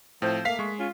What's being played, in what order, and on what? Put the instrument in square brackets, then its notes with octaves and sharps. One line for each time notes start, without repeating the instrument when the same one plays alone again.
[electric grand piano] A2 [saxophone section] F3 C4 C5
[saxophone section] A3 A#3 [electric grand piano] F5 B6 C7
[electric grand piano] G#3 C#6
[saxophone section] C#4 F4